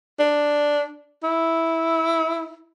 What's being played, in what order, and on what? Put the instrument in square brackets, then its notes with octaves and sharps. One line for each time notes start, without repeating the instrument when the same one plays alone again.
[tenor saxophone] D4
E4